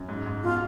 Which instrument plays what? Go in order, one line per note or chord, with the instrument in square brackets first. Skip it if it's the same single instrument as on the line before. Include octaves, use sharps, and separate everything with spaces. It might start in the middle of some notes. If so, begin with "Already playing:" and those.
Already playing: [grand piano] F#2
G#2
G#2
[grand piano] B2 [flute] F4